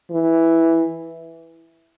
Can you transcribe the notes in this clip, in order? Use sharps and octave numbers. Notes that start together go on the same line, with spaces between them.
E3